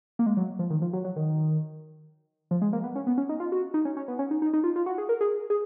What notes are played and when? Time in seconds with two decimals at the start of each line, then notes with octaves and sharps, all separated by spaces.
0.19 A#3
0.26 G#3
0.37 F#3
0.59 F3
0.70 D#3
0.82 F3
0.93 F#3
1.04 F#3
1.16 D#3
2.51 F3
2.62 G#3
2.73 A#3
2.84 B3
2.95 C#4
3.07 B3
3.18 C#4
3.29 D#4
3.40 F4
3.52 F#4
3.74 D#4
3.85 C#4
3.97 C#4
4.08 B3
4.19 C#4
4.31 D#4
4.42 D#4
4.53 D#4
4.64 F4
4.76 F4
4.86 F#4
4.98 G#4
5.09 A#4
5.21 G#4
5.50 G#4